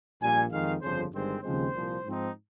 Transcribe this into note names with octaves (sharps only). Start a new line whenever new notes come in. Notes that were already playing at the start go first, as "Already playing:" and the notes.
A#1 A#2 G3 G#5
F2 D#3 G#3 F5
G1 F2 C#3 F3 C5
G1 G2 D#3 G#3 C4 C5
D#2 C#3 F3 G#3 C4 C5
C2 A#2 F3
G#2 F3 C4 D#4